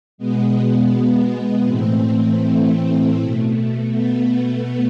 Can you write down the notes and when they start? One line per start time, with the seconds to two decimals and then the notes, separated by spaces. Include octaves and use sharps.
0.18 B2 G#3 B3
1.67 A2 E3 A3 C4
3.17 B2 A3
3.91 B3